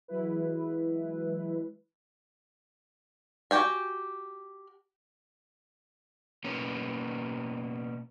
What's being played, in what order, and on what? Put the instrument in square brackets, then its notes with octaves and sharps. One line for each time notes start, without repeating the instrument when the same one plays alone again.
[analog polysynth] E3 F#3 G#3 E4 B4
[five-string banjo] F#4 G4 G5 G#5
[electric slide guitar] B2 A#3 B3 C#4